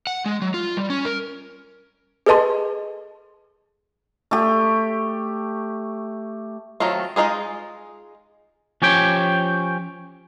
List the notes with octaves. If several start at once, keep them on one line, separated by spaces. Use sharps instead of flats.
F#5
G#3
F#3
F4
G3
C#4
A#4
G#4 A4 B4 D#5 A5 C6
A3 G4
D#3 F#3 A3 C4 F4
G#3 A3 D#4 F4 G#4
F3 C#4 G4 C#5 G5